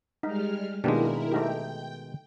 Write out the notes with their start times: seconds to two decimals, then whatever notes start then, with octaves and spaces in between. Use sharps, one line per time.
0.23 G3 G#3 D#4 F6
0.84 B2 D#3 G#3 A#3 D4 E4 G4 A#4
1.32 A3 D#4 G4 G5